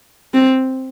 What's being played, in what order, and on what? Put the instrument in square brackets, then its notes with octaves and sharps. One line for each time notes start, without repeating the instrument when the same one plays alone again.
[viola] C4